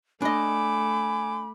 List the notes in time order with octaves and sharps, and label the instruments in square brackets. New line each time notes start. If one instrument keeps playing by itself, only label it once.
[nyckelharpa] A3 D6 [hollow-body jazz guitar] D4 D#5 [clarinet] G#5 [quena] B5